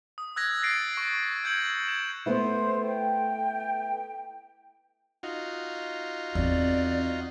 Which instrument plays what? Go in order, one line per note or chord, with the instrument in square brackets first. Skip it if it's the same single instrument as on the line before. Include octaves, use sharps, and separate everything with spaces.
[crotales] D#6
E6 F#6 G#6 A#6
A6 A#6 C7 D7
C#6
E6 G6 G#6 C#7 F#7
G#6 E7
[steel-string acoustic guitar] A3 B3 E4 [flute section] C5
[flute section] G5
[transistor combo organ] D#4 F4 F#4
[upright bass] E2 E3 [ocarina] C4 [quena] D5